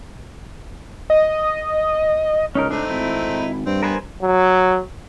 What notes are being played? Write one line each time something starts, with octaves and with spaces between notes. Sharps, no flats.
D#5
C#2 C#4 D#4 A#4
A3 C4 D4 D#4
G#1 E4
G2 C4
B3 A#4 C5 G#5
F#3